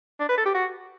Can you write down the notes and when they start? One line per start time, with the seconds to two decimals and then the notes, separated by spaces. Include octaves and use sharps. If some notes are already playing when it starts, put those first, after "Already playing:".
0.19 D4
0.29 B4
0.37 A4
0.45 G4
0.54 F#4